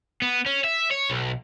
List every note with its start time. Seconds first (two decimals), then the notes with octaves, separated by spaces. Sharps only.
0.22 B3
0.46 C#4
0.64 E5
0.91 C#5
1.10 B1